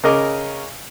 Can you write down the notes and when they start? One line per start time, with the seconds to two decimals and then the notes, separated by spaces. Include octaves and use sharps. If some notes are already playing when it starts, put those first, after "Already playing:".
0.03 C#3 A#4 D#5 D6